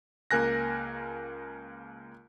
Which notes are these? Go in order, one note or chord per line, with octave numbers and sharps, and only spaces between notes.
C#2 A#3 A#4 G#5 F#6 A#6